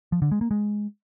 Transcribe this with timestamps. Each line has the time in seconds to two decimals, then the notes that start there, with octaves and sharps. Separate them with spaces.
0.12 F3
0.22 D3
0.31 G#3
0.41 A#3
0.51 G#3